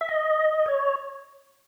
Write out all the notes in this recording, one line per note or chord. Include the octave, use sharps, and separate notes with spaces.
E5
D#5
C#5